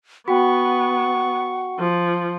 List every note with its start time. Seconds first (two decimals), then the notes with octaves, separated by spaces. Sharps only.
0.28 B3 F#4 F#5 G5 C#6
1.79 F3